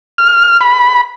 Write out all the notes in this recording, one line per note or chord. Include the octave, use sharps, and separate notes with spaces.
F6
B5